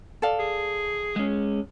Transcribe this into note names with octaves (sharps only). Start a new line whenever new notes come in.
A4 D5 F5
G#4
G#3 C#4